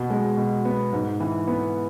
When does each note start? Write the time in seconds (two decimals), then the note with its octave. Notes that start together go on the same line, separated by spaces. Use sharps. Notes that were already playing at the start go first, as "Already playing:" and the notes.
Already playing: B2
0.10 G#3
0.37 B2
0.65 B3
0.93 G#2
1.20 E3
1.48 B3